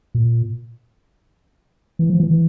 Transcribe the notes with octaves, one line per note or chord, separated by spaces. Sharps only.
A#2
E3
F3
E3
E3